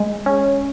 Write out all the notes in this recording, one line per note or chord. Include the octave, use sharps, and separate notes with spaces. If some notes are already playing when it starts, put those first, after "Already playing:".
Already playing: G#3
C#4